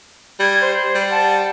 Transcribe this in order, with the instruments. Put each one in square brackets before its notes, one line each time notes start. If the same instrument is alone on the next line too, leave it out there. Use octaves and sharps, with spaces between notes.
[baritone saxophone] G3 [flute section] G#6
[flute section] C5
[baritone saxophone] G3
[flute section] F#5 A5